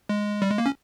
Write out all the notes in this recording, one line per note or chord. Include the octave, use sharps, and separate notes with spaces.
G#3
G3
G#3
A#3
C#4